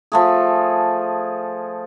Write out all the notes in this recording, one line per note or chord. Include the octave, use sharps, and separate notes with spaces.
F3 A3 G#4